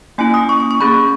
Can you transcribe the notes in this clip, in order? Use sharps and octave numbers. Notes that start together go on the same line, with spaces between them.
A#3 C#4 E4 G#5
D#6
C#6
C#6
C#6
A#3 C#4 G#4 B5